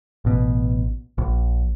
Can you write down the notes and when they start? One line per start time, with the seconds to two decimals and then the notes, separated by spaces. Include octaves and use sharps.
0.25 A1 B2
1.18 A#1